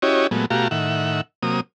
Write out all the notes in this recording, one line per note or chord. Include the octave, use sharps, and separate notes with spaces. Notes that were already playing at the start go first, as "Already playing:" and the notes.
C#4 E4 F#4 G4 C#5 D#5
A#2 F#3 G#3 A3 B3
B2 A3 F#4 G4 F5 A#5
A2 D#3 E5 F#5
C3 F#3 A#3 D#6